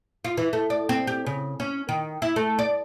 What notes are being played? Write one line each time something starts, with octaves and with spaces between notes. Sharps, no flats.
F4
E3
A3
D5
C4
G4
C#3
C#4
D#3
E4
A3
D5